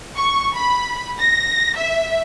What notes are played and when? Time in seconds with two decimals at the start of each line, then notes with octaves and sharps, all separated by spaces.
0.17 C#6
0.55 B5
1.19 A#6
1.78 E5